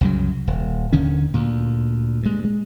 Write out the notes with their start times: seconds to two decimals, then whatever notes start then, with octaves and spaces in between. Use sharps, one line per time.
0.01 C2 F#2 C#3 F#3
0.47 D#1
0.93 D#2 D3 D#3 C#4
1.34 D2 A#2
2.23 G2 G#3
2.44 G#3